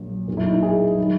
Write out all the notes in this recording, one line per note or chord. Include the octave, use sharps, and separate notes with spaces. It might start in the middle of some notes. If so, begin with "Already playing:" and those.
Already playing: A#1 A#2 F#3
B1 A#2 F#3
E4
D#4
E4
G#4
D#3 F#3